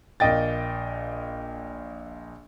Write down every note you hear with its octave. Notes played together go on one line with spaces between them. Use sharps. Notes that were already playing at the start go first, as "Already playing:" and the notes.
A#1 A#3 D#5 G5 A6